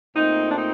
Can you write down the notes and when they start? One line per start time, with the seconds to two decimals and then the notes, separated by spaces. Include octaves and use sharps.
0.15 A#2 A3 C4 D#4
0.50 D4
0.58 D#4